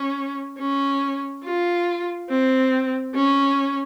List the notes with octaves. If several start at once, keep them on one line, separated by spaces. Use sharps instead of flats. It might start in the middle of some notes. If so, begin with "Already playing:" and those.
Already playing: C#4
C#4
F4
C4
C#4